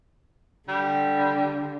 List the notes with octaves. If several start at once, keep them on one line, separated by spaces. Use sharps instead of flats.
D3 G3